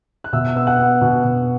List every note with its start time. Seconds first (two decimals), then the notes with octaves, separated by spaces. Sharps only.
0.24 F#6
0.33 B2 E5 E6
0.56 B3 E6
0.67 F#5 F#6
0.78 B3
1.01 B2
1.24 B2